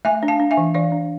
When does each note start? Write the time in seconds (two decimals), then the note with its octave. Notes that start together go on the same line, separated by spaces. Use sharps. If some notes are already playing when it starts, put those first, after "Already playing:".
0.05 A3 E5 G#5
0.23 D4
0.28 F5 A5
0.40 D4
0.51 E5 G#5
0.57 E3
0.74 E3 D5 F5
0.92 D4